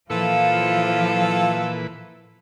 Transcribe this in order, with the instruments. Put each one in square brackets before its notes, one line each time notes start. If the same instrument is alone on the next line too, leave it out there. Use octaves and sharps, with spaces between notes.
[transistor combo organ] A#2 E3 B4 [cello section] F3 [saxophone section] E4 F4 A4 [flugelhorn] F5